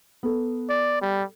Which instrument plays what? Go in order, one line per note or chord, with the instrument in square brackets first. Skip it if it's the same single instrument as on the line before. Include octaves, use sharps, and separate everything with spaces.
[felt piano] B3 A4
[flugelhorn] D5
G3